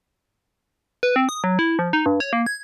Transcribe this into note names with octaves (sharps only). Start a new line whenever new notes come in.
B4
C4
D#6
F#3
E4
F3
D#4
G2
C#5
A#3
G#6